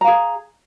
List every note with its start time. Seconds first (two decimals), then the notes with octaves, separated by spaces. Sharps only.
0.01 A#5
0.04 F5
0.08 G#4